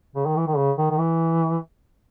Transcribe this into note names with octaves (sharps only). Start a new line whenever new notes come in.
C#3
D#3
E3
D#3
C#3
D#3
D#3
E3